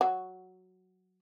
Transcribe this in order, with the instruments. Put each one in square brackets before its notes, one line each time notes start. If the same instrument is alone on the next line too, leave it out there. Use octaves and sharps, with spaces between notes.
[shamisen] F#3 F#4